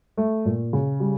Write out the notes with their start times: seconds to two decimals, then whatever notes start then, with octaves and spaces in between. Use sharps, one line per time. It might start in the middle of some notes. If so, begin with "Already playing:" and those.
0.17 A3
0.45 A#2
0.73 C#3
1.00 G3